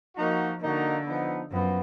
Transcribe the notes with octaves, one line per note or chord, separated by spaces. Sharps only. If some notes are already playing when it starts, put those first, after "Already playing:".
F3 A#3 D#4 F#4
D3 A#3 D#4 F#4
F3 B3 D#4
F#2 F3 B3